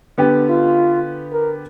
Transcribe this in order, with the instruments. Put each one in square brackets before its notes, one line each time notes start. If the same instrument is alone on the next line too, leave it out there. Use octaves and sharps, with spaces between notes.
[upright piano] D3 B3 G4
[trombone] F4
A#4